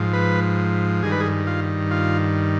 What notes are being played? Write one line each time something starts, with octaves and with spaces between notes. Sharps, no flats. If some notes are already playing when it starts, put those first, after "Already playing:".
Already playing: G#2 F3
B4
G2 D#3 G#4
B4
G#4
F4
F4